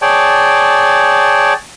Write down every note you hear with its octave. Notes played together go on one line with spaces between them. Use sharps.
G#4 C#5 D5 G5 A5